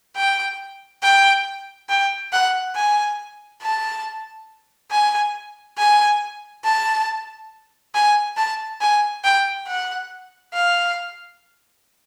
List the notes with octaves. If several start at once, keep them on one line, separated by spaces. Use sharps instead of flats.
G5
G5
G5
F#5
G#5
A5
G#5
G#5
A5
G#5
A5
G#5
G5
F#5
F5